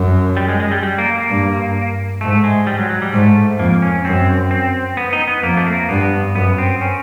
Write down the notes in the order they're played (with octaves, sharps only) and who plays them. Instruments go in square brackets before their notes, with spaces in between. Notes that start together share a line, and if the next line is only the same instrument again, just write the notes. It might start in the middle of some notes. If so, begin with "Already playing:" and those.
Already playing: [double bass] F#2
[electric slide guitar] G3
G#3
G#3
G3
G3
A#3
A#3
[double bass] G2
[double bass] G#2 [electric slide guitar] A3
[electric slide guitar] G#3
G3
F#3
F#3
G3
[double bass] G#2 [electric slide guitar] A3
[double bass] F2 [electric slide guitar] A#3
[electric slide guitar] C#4
[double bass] F#2 [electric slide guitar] C4
[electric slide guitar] C4
B3
D#4
B3
[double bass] F2 [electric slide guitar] A#3
[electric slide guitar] A3
A#3
[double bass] G2 [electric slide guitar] B3
[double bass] F#2 [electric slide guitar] B3
[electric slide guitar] C4
C#4